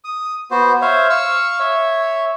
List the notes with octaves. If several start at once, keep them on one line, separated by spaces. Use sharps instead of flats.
D#6
B3 F#4 C5
C5 C#5 E5 F5
F5 C#6 E6
C#5 E5